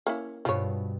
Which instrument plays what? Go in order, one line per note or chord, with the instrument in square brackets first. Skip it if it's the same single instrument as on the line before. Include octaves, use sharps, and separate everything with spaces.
[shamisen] A#3 C#4 E4
[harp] G2 B2 [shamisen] F3 C#5